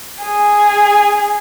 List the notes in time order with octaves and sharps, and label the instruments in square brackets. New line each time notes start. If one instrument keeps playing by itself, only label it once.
[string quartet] G#4